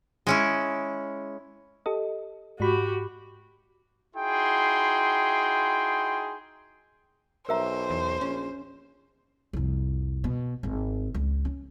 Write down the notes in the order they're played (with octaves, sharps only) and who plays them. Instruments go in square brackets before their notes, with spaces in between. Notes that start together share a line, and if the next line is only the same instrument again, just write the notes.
[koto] G#3 C#4 E4
[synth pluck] G4 A4 D#5
[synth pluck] G#2 B5 [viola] F#4 G4
[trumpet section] D#4 E4 F#4 G#4 G5 C6
[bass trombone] B1 [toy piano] A#4 E5 A#5 [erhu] C5
[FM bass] E2
[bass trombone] A#1 [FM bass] C#4
[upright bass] C2 F2
B2
G#1
C#2
C#4